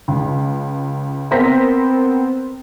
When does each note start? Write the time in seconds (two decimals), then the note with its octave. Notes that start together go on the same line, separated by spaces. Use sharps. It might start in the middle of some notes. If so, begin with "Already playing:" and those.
0.08 C#2
1.31 B3 C4 A#4 C5 A#6 B6